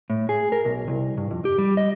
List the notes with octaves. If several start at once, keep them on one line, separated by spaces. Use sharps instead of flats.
A2
G#4
A#4
B1
C2
G2
F2
G4
G3
D#5